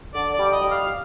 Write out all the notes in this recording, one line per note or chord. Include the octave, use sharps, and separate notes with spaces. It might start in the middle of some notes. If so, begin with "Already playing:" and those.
D3 D5
D5
G3
D#5
G3
F5